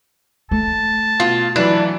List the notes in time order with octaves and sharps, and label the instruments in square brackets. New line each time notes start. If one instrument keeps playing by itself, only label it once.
[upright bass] A3 [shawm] A5
[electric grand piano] B2 [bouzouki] F4
[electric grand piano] E3 F#3 E4 [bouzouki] D4 B4